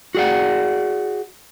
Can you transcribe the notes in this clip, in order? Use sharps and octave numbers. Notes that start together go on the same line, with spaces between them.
F#4 G#4 D5 F#5